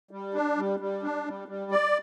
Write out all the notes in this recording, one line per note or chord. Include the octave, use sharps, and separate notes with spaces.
G3
D4
G3
G3
D4
G3
G3
D5